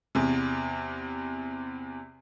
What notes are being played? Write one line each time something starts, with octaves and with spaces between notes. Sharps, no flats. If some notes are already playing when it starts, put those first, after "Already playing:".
E2 C3